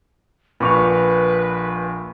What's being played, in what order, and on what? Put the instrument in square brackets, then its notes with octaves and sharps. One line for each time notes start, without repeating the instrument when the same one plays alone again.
[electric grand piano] A#1 A#2 [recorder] B4 [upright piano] B5 C#6 F7